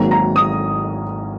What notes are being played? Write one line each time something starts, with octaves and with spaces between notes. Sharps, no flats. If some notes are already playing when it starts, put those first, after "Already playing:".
Already playing: G#1 G#2 D#3 F#3 A#3 A#5
A#5
D#6